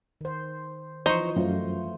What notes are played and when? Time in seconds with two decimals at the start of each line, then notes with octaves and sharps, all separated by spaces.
0.21 D#3 C5
1.06 E3 F3 D#4 C5 C#6
1.36 F#2 A3 F4 C5